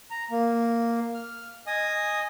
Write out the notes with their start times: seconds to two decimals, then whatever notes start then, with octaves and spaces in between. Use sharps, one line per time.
0.11 A#5
0.31 A#3
1.14 F6
1.67 D#5 G#5 D#6